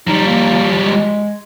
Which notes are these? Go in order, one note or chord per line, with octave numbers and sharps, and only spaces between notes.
F3 G3 D#4
A#3
G#3